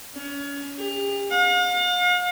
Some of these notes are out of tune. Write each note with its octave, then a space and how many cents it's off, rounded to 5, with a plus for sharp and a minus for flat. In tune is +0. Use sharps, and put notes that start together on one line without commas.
C#4 +30
G4 +40
F5 +45